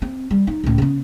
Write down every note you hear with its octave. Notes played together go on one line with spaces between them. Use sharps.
C4
G3
D#4
C#2 A2
C#3 B3